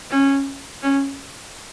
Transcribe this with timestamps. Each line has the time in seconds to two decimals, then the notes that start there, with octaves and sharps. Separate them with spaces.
0.10 C#4
0.82 C#4